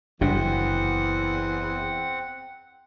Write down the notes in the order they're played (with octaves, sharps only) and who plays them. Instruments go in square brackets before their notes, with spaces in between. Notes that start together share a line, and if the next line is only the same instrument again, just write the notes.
[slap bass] F#1 C3 [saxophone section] E2 [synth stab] G2 [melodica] C4 F#5